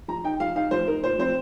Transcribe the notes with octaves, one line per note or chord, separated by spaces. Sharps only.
F3 A#5
D#4 G5
F3 F5
D#4 F5
F3 C5
D#4 A#4
A#2 C5
F3 C4 C5